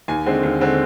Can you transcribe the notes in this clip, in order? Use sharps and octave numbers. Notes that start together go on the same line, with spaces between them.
D#2 G#5
D3 G#3 C4
D#2
D3 G#3 C4